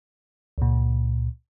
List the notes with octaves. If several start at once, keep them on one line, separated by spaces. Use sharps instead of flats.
C#2 A#2